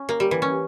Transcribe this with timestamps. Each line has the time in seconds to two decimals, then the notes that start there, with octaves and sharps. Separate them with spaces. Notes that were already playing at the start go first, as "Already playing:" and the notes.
Already playing: C#4
0.09 A#3
0.20 G3
0.31 E3
0.42 C#4